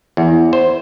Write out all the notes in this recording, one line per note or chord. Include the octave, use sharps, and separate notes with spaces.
E2
C5